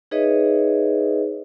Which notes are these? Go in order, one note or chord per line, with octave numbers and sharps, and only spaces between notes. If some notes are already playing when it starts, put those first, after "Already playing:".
D#4 G#4 B4 C#5 D#5 E5